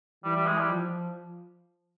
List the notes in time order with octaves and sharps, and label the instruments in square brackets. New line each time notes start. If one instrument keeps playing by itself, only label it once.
[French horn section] E3 [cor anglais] G3
[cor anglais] G3
G#3
G3
[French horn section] F3